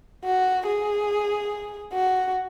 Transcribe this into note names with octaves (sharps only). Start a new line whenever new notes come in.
F#4
G#4
F#4